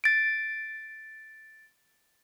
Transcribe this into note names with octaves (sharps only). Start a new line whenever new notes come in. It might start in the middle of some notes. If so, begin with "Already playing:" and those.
A6 D7